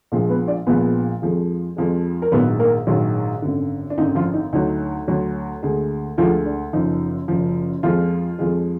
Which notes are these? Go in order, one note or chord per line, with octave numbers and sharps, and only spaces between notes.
A#1 A#2 F3 G#3
B3 B4
D4 D5
A#1 A#2 F3 G#3 B3 B4
F2 F3 G#3
F2 F3 G#3
A#4
A#1 G#2 D#3 F#3 B3 B4
A#3 A#4
A#1 G#2 D#3 F#3
G#1 F#2 D3
D4
G#1 F#2 D3 D#4
F3 F4
D#4
D2 D3 F#3 D#4
D2 D3 F#3
D2 D3 G#3
D2 D3 F3 G#3 F4
D4
F#1 F#2 F3 D#4
F#1 F#2 F3
F2 F3 G#3 F4
F2 F3 G#3